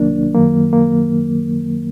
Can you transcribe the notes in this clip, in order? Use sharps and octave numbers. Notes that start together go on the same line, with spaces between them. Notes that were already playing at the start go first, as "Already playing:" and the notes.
Already playing: C2 C3 D#3 F#3 A#3 D4
F#2 D#3 F#3 A#3
A#3